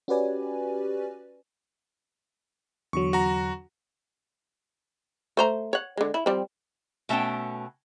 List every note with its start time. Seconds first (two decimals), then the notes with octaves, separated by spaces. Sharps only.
0.08 C#4 F#4 G4 B4 D5 G#5
2.93 E2 D3 F#3 C#6
3.13 F#4 A#5
5.37 A3 C5 A#5
5.73 C#5 F#5
5.97 D3 G#3
6.14 E4
6.26 F3 G3 C4
7.09 B2 A3 C#4 G5 A5